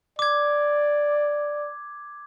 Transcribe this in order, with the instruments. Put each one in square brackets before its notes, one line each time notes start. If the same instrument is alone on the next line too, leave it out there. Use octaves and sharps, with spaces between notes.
[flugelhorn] D5 [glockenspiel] D6 G#6